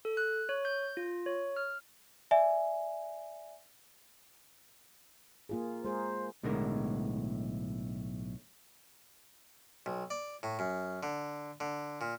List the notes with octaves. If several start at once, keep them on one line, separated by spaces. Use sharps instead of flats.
A4
F#6
C#5
G6
F4
C#5
F6
D5 E5 G#5
A#3 F4 G#4
G#3 G#4 A#4 C5
B1 A2 D3 G#3 A#4
B1
D5
A2
F#2
D3
D3
A#2